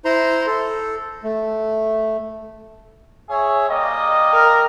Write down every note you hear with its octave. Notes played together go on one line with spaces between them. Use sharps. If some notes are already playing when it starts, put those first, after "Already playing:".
E4 C5 A#5 C6
A4
A3
G#4 C#5 E5
G3 A#3 D#5
A#4